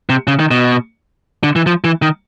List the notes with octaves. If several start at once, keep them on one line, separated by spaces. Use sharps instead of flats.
C3
C#3
D#3
B2
D3
E3
F3
E3
D#3